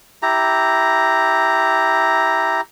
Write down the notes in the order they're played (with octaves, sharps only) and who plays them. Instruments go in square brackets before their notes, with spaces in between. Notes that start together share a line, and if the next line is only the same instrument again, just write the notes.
[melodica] E4 G4 A#5